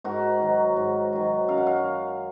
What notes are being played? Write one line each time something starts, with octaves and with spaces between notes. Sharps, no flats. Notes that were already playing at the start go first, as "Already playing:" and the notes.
G#2 F#4 A#4
D#3 F#3
G#2
D#3 F#3
F#2 F5
F#5
C#5 F5